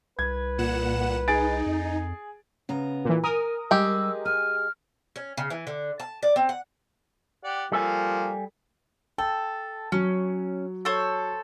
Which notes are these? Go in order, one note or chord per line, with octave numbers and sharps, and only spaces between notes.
C2 B4 G#6
A#2 F#5 E7
D#4 G#4 A6 D7
F2
C#3 B3 A#5
A#2 E3
A#4 G#5 D#6
G3 G#3 G4 E6
G#5 F6
C#4
C#3
E3
D3
A5
D5
C4
F#5
G4 D5 F#5
F3 G3 A#3 A4 G#5
A4 G5
F#3 C#4
A4 C5 C#5